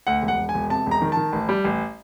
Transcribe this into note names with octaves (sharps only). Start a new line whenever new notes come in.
D2 F#5
E1
F#5
E1
G#5
E1
C3 A5
E1
A#5
D#3
D#3 A5
A1
G3
A1